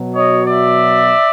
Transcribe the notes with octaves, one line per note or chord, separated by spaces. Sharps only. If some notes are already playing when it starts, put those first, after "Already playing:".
Already playing: B2 F#3
C#5 D#5
D5 E5